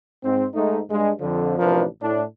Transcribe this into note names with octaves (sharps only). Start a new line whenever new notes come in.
G#2 C4
G#2 A3 D#4
G2 G#3
F2 D3 F3
A1 C3 F3 D4 A#4 B4
A2 D4